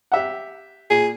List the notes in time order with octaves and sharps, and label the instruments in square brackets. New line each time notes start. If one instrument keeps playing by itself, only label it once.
[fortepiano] G4 E5 F#5
[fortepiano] A#2 [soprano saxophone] G#4